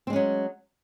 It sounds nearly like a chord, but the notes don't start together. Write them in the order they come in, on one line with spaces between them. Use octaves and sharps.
C4 G#3 C#4 F#3